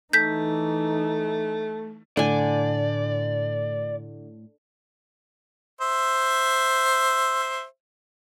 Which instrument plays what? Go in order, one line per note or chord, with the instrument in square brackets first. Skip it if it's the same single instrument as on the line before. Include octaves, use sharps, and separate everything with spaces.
[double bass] E3 D#4 [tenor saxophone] A3 [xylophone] G6 B6
[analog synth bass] A2 [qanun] D3 G#5 [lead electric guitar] D5
[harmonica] C5 E5